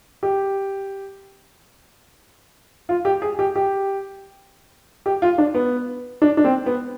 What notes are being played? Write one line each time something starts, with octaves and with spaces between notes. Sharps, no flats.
G4
F4
G4
G#4
G4
G4
G4
F4
D4
B3
D4
D4
C4
B3